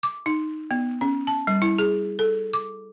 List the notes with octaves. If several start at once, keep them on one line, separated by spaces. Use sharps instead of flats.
D6
D#4
B3
C#4
A5
G3
E4
G#4
A4
D6